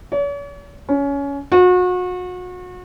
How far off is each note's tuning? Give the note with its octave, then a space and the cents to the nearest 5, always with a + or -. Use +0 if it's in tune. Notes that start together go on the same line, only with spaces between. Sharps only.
C#5 +45
C#4 +20
F#4 -35